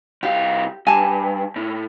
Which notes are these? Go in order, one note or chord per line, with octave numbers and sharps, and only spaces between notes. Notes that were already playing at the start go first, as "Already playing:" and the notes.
C2 G4 F5
G2 G#5 A5
A2